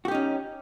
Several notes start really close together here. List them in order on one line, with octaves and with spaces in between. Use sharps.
F#4 G4 D#4 C#4